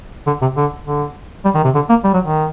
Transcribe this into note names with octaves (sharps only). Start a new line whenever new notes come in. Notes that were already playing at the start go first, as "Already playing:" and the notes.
D3
C3
D3
D3
G3
D#3
C3
D3
A#3
G3
F#3
D#3